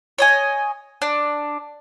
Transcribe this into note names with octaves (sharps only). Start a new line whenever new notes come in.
C#5 D#5 G#5
D4